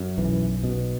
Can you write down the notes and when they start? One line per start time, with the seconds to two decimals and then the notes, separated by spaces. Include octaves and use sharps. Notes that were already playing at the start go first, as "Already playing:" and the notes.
Already playing: F#2
0.18 B1 E3
0.63 B2